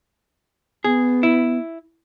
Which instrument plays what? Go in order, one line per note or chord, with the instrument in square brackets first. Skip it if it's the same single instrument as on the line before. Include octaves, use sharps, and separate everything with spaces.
[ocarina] B3 [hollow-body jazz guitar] G#4
[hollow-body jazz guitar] E4